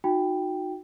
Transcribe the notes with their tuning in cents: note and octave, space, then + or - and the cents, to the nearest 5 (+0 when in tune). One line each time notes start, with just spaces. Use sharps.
D#4 +0 F#4 -20 G5 +0